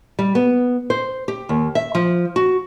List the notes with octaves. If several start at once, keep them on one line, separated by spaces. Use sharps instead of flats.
G3
B3
C5
G4
D#2
E5
F3
F#4